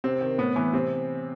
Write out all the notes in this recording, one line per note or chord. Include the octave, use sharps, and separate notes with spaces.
C3 C4
D#3
A2 B3
E3 B3
C3 C4